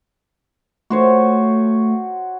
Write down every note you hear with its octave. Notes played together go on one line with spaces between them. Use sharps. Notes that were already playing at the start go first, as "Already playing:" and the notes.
A3 F#4 C5 C#5